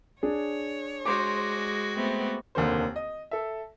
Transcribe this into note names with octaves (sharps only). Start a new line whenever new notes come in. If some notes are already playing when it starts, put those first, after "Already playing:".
D4 G#4 C#5
G#3 F#4 C5 D6
A3 B3 C4
F1 D#2 D3 A#3 C5
D#5
A4 E5